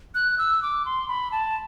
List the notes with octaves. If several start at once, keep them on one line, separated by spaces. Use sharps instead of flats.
F#6
E6
D6
C6
B5
A5